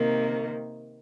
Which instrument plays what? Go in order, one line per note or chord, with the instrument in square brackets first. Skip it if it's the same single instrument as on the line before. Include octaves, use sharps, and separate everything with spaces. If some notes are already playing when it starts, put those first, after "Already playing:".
Already playing: [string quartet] C3 D#3 A#3